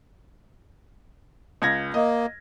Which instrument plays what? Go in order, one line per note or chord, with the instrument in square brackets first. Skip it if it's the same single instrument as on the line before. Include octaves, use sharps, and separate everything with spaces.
[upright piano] C#2 G#6 A#6
[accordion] A#3 [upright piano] D#5